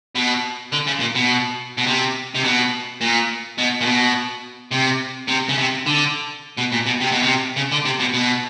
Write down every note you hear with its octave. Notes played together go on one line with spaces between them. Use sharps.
B2
D3
C#3
A#2
B2
B2
C3
C3
B2
A#2
B2
A#2
B2
C3
C3
C#3
C3
D3
B2
A#2
B2
C3
B2
C3
C#3
D3
C3
B2
B2